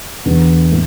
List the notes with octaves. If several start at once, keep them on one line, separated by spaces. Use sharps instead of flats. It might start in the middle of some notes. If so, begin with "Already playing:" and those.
E2 D3 B3
A2